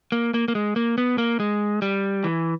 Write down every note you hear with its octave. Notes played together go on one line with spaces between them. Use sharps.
A#3
A#3
A#3
G#3
A#3
B3
A#3
G#3
G3
E3